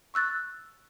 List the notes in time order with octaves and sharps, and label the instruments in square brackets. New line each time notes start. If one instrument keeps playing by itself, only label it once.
[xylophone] C#6 E6 F#6 A6